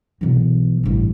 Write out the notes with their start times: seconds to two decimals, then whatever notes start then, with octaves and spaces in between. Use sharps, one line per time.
0.21 B1 E3
0.83 A1 G2